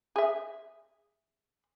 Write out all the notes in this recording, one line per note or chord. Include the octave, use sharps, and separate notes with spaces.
G#4 E5